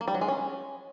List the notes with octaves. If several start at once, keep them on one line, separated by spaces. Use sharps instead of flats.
A#3
G3
F#3
G#3
C#4